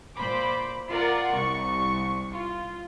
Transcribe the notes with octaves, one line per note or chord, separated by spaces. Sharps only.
A#2 C5 B5 D6
F4 A#4 D5 F#5
C2 C#6
F4